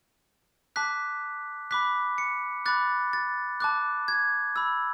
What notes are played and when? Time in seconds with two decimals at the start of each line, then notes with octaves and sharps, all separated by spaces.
0.76 A5 D6 F#6 B6
1.71 B5 D6 F#6 B6
2.18 C#7
2.66 B5 D6 F#6 A6
3.13 A6
3.60 A5 D6 F#6
4.08 G#6
4.56 B5 E6